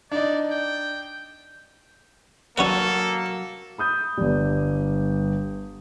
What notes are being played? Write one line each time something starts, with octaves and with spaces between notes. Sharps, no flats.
D4 D#4 D5
G5
F#3 A#3 C#4 F#4 A4 B4
B5 D#6 G6
G1 G3